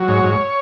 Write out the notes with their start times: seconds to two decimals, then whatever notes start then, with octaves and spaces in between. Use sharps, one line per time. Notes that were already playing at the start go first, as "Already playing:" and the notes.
Already playing: F#3
0.08 G#2 C#5
0.24 G#2